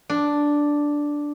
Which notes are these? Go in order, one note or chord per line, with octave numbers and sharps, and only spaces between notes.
D4